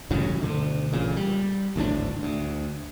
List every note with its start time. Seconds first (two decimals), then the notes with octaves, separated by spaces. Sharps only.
0.10 A1 G2 C#3 F#3
0.41 D2 B2 D3 D#3
0.92 A1 A#2 C#3
1.16 G3
1.76 G#1 D2 A2 D4
2.23 D2